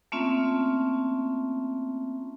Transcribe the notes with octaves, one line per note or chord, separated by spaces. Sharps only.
A3 A#3 C4 C#4 F4 E5